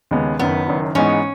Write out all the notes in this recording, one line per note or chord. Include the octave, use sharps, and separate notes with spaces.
D#2 C#3 G#3 B3
F#1 F#2 D#3 B3
F#1 F#2 D#3
G#2 E3 G#3 B3 C#4 D#4